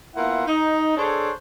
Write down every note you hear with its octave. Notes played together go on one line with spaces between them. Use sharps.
A#3 B3 E4 F4 E5 F#5
D#4
D4 G#4 A4 C5 C#5